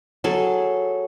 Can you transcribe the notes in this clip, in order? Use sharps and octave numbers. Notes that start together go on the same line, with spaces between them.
F#3 G#4 A4